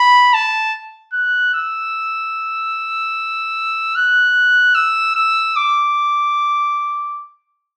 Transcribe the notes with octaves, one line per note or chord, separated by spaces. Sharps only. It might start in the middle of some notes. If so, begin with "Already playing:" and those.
Already playing: B5
A5
F#6
E6
F#6
E6
E6
D6